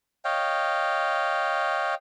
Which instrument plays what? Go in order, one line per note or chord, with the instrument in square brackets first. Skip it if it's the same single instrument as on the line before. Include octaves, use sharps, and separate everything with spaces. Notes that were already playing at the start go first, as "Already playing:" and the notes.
[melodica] C#5 D#5 F5 G5